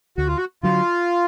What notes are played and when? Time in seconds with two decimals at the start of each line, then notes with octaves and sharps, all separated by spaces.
0.18 D2 F#4
0.27 F4
0.37 F#4
0.63 D3 F#3 F4